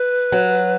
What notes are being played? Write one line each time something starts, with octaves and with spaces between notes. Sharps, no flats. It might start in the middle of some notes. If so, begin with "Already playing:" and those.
Already playing: B4
F#3